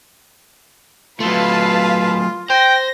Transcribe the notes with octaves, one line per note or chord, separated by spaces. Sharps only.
F#3 A3 F4 B4 F5 A5
C5 G5 A#6